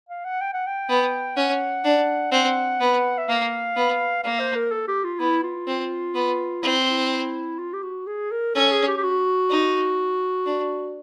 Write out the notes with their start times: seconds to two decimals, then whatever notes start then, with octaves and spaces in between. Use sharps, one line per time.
0.09 F5
0.25 F#5
0.41 G5
0.53 F#5
0.66 G5
0.89 B3
1.36 C#4 F#5
1.84 D4
2.32 C4 F#5
2.80 B3
3.18 E5
3.28 A#3 F5
3.76 B3
4.24 A#3 F5
4.39 C5
4.55 A#4
4.71 A4
4.88 G4
5.04 F4
5.20 B3 E4
5.43 F4
5.67 C4
6.15 B3
6.63 C4 E4
6.87 E4
7.58 F4
7.73 G4
7.83 F#4
8.07 G#4
8.31 A#4
8.55 C#4 A4
8.71 G#4
8.87 G4
8.97 G4
9.03 F#4
9.50 D#4
10.46 D4